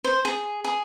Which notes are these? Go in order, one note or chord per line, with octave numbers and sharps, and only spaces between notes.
C5
G#4
G#4